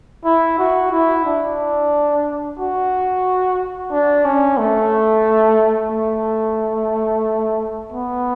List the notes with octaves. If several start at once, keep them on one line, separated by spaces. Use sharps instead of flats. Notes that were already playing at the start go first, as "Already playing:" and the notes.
E4
F#4
E4
D4
F#4
D4
C#4
A3
A3
B3